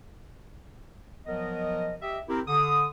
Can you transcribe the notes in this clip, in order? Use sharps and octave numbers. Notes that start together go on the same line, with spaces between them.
F3 F#3 B3 A#4 D#5
G4 D#5 E5
C4 E4 G4 A#4
D3 D#6